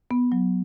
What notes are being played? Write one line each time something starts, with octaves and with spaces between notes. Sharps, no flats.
B3
F#3